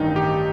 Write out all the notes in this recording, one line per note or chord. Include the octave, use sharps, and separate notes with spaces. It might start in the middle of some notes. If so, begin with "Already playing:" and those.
Already playing: A1 G2 D#3 D#4
G4